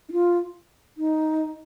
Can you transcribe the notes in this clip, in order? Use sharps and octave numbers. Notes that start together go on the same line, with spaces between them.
D#4
F4
D#4